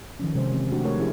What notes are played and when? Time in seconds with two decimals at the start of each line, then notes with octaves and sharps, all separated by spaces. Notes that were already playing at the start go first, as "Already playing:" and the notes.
0.20 D#3 F3 C#4
0.35 C3 G#3 C#4 C5
0.51 E3 G#3 C4
0.71 A3 D4 F#4 G4
0.84 A3 A#4 C#5
0.97 F3 A3 C#4 E4 G4 G#4